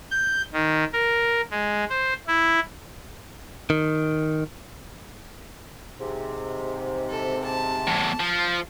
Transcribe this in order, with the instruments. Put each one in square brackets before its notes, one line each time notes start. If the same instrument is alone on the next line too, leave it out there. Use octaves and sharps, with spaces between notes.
[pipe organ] G6
D#3
A#4
G#3
C5
E4
[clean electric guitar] D#3
[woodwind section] G#2 C3
[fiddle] A4
A5
[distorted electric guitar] E2 A2
F3